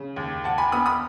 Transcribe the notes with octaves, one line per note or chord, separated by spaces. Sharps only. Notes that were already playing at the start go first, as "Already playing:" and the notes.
Already playing: C#3
D#2
D#2 F#5 A5
G#5 B5
B3 B5 D#6
B5 D#6